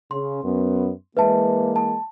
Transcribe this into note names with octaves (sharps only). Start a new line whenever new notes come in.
C#3 C6
F#2 B3
E3 G#3 A#3 B4 E5 A5
A5